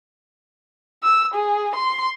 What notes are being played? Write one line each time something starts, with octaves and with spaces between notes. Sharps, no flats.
E6
G#4
C6